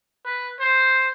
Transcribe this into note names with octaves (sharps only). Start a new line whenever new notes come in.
B4
C5